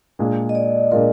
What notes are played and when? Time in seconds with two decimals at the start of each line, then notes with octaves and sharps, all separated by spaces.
0.19 A#2 G#3 D4 F4
0.49 D#5
0.55 D5
0.91 A#2 G#3 D4 F4 A#4